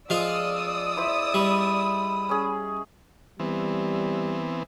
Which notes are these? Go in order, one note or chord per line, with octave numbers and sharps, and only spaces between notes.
F3 G#3 F4 D5 D#6 E6
E4 C5 E5
G3 B5
C#4 G#4
E3 G3 B3 C4